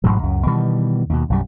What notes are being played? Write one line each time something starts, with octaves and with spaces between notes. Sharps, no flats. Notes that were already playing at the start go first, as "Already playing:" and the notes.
A1 G#2 B2 F#3
C#2 F#2
B2 D#3 E3 G3
D#2 B2
B1 F#2 G3